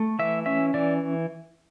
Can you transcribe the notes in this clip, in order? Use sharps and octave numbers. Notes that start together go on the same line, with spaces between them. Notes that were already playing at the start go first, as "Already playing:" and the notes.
Already playing: A3
E3 E5
C#4 E5
E3 D5